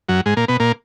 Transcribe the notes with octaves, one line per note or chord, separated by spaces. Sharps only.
F#2 F#3
G#2 G#3
A#2 A#3
B2 B3
A#2 A#3